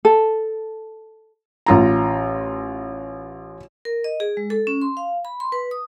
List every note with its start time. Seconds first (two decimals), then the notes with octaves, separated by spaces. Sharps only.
0.05 A4
1.66 A1 F4 A#5
3.85 A#4
4.04 D#5
4.20 G#4
4.37 G#3
4.50 A4
4.67 C#4
4.82 C6
4.97 F5
5.25 B5
5.40 C6
5.52 B4
5.71 D#6